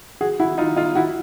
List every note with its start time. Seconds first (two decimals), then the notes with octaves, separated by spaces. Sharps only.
0.21 F#4 G#4
0.40 E4 F#4
0.58 D#4 F4
0.76 D#4 F4
0.95 E4 F#4